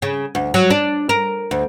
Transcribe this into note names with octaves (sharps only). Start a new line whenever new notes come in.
C#3
D2
F#3
D4
A#4
D2